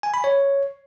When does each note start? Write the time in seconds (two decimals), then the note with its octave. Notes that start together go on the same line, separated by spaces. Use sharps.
0.03 G#5
0.14 B5
0.24 C#5